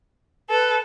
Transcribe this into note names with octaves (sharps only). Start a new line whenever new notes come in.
A4 B4